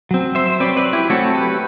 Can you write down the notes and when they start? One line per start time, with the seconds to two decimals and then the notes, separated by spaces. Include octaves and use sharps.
0.11 F#3 C4
0.35 C5 E5
0.50 C5
0.60 F#3 C4 B4 D5
0.77 B4 D5
0.93 E4 G4
1.10 F#3 A3 C4 F#4 A4
1.34 G4 B4